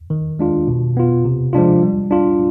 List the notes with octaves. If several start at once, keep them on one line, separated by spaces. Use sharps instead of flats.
D#3
G#3 D4 F4
B2
B3 F4
C3
F3 G#3 D4 F4
G3
D4 F4